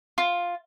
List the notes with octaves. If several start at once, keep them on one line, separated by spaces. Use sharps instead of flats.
F4